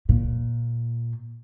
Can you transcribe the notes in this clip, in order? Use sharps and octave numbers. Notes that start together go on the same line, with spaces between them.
A#2